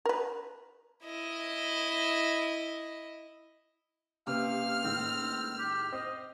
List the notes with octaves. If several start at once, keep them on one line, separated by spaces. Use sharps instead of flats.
A#4 B4
E4 D#5
C3 A#3 C#4 B4 F5 F6
A2 D#3 G#3 C4
G4
C4 D#5